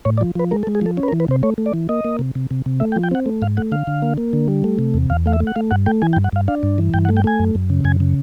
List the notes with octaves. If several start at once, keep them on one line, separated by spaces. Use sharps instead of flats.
A2 C#5
D5
F3
F3 B4
G#3 A#4
A4
G#3
G#4
F3 A4
C#4
B4
A#4
E3
B4
C3 C5
A3 C#5
A3
D5
E3
A#3 D#5
A#3
C3
C3
C3
C3
A3 E5
G5
F3
G5
C4 F#5
A3
G#2 F5
A3 F#5
D3 F5
D3
A#3
A#3
D3
G3
A3
C3
E2
E2 F5
A3 F5
E5
A3
F#5
A3 F5
G2 F#5
A3 G5
E3 G#5
G5
G2
F#5
G2 F5
D4 F5
G2
E3
G2 G5
F#5
A3
G5
A3 G#5
F#2
F#2
C#3
F#2 G#5
C#3